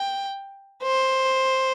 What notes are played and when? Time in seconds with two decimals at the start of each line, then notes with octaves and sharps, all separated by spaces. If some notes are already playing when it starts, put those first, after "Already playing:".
Already playing: G5
0.83 C5